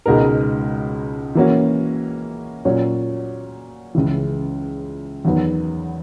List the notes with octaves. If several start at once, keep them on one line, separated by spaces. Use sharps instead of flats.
C#2 B2 G#3 D#4 A#4
E3 A#3 C#4 F#4
A#2 F#3 C#4 F#4 C#5
C#2 C#3 E3
E2 D#3 F#3 B3